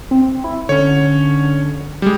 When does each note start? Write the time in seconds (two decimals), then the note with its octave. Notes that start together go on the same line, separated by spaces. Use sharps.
0.11 C4
0.44 E4
0.69 D3 C#4 C#5
2.02 G3 G#3